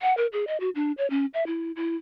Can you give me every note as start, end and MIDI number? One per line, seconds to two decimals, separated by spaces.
0.02 0.15 78
0.17 0.27 70
0.33 0.45 68
0.47 0.59 75
0.60 0.70 66
0.75 0.92 62
0.98 1.08 73
1.10 1.26 61
1.34 1.44 76
1.47 1.72 64
1.76 1.96 64